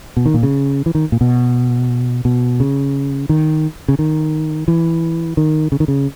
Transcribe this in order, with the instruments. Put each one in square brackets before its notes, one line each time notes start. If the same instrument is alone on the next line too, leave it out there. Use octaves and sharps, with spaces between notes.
[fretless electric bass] B2
D#3
A#2
C#3
E3
D#3
A#2
B2
B2
C#3
D#3
C#3
D#3
E3
D#3
C#3
D#3
C#3